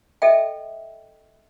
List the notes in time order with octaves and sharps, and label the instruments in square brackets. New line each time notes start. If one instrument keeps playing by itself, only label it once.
[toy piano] A4 D#5 E5 G5